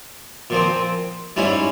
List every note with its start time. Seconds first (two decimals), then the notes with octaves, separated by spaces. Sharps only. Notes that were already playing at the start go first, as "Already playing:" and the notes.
0.50 A#2 F3 C4
1.36 G#2 G3 C#4 E4